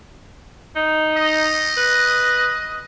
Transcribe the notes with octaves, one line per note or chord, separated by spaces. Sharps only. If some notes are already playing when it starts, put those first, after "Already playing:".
D#4
D#5
B4